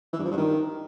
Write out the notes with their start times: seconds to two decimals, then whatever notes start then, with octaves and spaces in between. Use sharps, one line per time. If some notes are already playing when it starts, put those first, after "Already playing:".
0.13 E3
0.19 G2
0.25 F3
0.31 G2
0.37 D#3